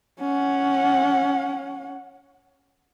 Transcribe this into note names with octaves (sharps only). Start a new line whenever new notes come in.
C#4 F#5